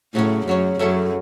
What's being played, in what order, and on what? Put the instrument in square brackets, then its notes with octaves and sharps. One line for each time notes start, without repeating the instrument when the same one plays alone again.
[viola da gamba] A2 [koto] C#3 F#3 C#4
[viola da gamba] F#2 [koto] C#3 F#3 C#4
[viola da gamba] F#2 [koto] F#3 A3 C#4 E4 A4